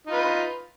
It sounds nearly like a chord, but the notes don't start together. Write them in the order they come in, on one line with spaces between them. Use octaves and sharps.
D#4 F4 B4